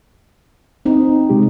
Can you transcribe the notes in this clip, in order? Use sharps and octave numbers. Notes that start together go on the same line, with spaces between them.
C4 D#4
C3 G#3 G4